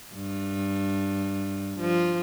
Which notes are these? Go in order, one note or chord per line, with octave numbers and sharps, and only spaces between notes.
G2
F3